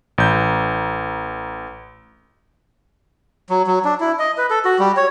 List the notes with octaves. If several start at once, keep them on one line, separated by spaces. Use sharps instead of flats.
A1 G6
F#3
F#3
D4
E4
D#5
B4
A4
F#4
G3
C#5